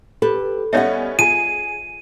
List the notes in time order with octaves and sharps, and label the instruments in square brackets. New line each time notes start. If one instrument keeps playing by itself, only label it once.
[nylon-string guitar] G4 A4 B4
[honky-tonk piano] G3 B3 C#4 [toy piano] A4 C#5 E5 [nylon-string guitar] D#5 F#5
[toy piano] F4 G#5 [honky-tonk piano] G#4 [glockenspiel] D#7